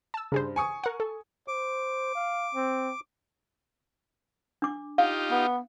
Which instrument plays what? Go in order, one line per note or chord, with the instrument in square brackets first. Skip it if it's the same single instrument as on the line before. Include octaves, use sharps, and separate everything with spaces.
[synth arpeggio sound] A5 E6
[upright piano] G2 [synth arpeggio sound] C#3 G#4 C5
[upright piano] G#5 C#6 D#6
[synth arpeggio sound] A#4 F#5
A4
[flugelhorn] C5 [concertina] D6
[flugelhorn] F5
C4
[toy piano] D4 D6
[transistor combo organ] D#4 F4 G4 [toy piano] F5
[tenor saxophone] B3